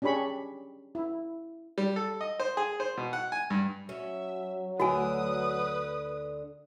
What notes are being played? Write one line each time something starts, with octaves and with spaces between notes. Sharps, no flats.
C#4 D4 G4 G#4 B5 C#6
E4
G3
A4
D#5
C5
G#4
C5
B2
F#5
G#5
G2
F#3 C#4 E5
D2 D3 F#4 B4 G#5 D#6